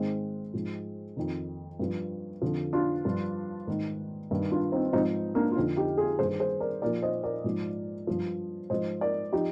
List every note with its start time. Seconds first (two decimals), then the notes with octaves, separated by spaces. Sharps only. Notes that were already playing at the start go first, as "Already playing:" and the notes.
Already playing: G#2 D#3 G#3 C4
0.54 G#2 F3
1.17 F2 D#3
1.79 G2 F3
2.42 F2 D3 F3
2.73 D4 F4
3.05 G2 F3
3.67 G#2 D#3
4.31 G2 D#3
4.51 D4 F4
4.72 C4 D#4
4.93 G#2 F3 C4 D#4
5.35 A#3 D4
5.52 F4
5.56 F2 D3 F3 C4 D#4
5.77 D#4 G4
5.98 F4 G#4
6.19 G2 D#3 G#4 C5
6.40 G#4 C5
6.60 A#4 D5
6.82 A#2 A#4 D5
6.86 F3
7.02 C5 D#5
7.23 A#4 D5
7.44 G#2 F3
8.07 G2 F3
8.70 G#2 F3 C5 D#5
9.01 A#4 D5
9.32 F3 D#4 G4